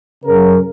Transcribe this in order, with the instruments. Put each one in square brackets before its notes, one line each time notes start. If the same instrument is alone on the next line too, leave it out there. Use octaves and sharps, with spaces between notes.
[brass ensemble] F#2 C#3 A#4